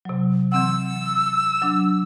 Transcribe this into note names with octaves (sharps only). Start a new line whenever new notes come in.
C3 F#3
E3 C4 F#5 E6
F#3 D4